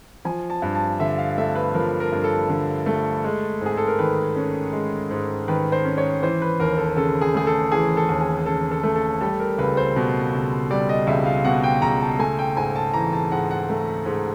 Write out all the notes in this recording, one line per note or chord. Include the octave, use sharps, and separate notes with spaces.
F3 G#5
A5
G2
A5
D3 E5
F5
A3 E5
B4
F3 A#4
A#4
G2
A4
D3
A3
G#3
G#2 G#4
A4
A#4
D#3 B4
C#4
G#3
G#2
D#3 B4
C5
C#4
C#5
E3 C5
B4
D#2 A#4
A4
C#3 A4
G#4
A3 G#4
A4
E3 G#4
A4
D#2
G#4
G#4
C#3 A4
A4
A3
A4
G3 A4
A#4
C#2 B4
C5
B2
C#2
G3 D5
D#5
C#2 E5
F5
B2 F#5
G5
C#2 A#5
A5
A3 G#5
G5
G#2 G#5
A5
E3 A#5
A5
G#2 F#5
F#5
A3
G#2